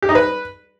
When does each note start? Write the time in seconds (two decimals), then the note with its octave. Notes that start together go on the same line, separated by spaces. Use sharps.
0.02 G4
0.09 D#4
0.15 B4